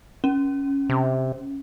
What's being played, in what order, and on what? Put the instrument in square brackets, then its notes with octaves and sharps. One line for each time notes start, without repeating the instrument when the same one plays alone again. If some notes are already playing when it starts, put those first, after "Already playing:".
[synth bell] C#4
[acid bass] C3